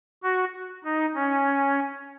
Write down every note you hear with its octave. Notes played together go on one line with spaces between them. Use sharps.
F#4
D#4
C#4